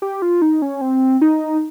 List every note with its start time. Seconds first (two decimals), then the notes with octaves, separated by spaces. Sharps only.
0.02 G4
0.22 F4
0.42 D#4
0.62 C#4
0.81 C4
1.21 D#4